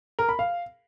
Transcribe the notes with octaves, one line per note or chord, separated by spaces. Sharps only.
A#4
B5
F5